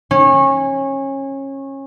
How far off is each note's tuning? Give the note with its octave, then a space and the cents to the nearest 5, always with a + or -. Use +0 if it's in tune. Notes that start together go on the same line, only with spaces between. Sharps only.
C#4 -25